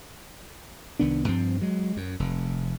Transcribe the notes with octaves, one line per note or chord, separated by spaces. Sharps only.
C2 D#3 B3 D4
G2 F3 C4
F#3 G#3
F#2
F1